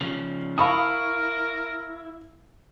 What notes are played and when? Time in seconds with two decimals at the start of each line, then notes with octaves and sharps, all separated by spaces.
0.01 C#3 F3 F7
0.58 E4 A#4 F5 G5 A5 B5 C#6 D#6